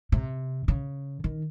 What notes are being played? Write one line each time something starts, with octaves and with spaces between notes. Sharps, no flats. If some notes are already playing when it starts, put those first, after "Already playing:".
C3
C#3
D#3